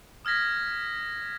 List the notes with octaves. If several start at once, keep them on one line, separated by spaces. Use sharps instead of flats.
D#6 F6 G#6 A#6 B6